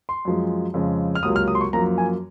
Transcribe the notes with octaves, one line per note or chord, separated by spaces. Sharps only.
C6
F#2 F3 G#3
F2 C#3 G#3
F6
C#2 C3 F#3 A#3 D#6
F6
D#6
C6
C#6
F#2 F3 A#3 A#5
G#5